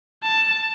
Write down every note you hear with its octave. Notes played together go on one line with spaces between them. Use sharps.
A5